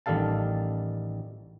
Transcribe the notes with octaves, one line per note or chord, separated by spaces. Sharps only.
A1 D#3 G3 A4 F5 A5